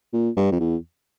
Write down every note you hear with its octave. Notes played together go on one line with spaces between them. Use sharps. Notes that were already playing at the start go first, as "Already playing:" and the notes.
A#2
G2
F2
E2